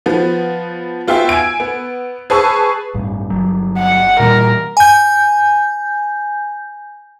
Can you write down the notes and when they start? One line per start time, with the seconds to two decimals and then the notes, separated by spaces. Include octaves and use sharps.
0.06 F3 B3
1.08 B3 F4 F#4 E5 G5
1.29 G#5 E6 G#6 D7
1.60 B3
2.30 G#4 B4 A5 C#6 E6
2.94 A1 G2
3.30 G1 F#3
3.78 F#5
4.20 A#2 E3 G3 A#4
4.77 G#5 G6